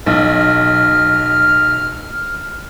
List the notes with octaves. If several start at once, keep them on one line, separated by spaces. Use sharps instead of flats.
B1 F6